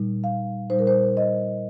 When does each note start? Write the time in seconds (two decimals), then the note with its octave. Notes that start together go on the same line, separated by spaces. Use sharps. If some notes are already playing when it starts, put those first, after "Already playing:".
Already playing: A#2 G3 D#4
0.24 F5
0.70 A#2 G3 D#4 C5
0.79 A#4
0.87 C5
1.17 D#5